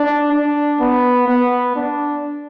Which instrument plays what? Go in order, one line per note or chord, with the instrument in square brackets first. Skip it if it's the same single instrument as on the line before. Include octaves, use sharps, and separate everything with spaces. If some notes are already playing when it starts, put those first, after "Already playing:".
Already playing: [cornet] D4
D4
B3
B3
D4